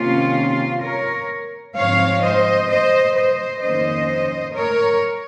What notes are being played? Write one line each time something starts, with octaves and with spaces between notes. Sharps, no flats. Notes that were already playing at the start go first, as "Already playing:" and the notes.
Already playing: C3 D#3 A#3 C#4 F4
A#4 C#5
G#2 F3 C4 C#5 F5
C5 D#5
C5 D#5
C5 D#5
F2 D#3 A#3 C#4 C5 D#5
A#4 C#5